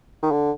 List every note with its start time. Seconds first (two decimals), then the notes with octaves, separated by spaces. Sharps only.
0.23 D#3
0.32 D3